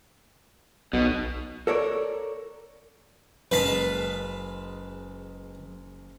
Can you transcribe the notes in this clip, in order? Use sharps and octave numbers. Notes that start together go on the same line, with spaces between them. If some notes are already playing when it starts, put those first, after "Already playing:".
B1 B2
A4 A#4 C#5 D5
F#1 G#3 B4 F5 A5 B6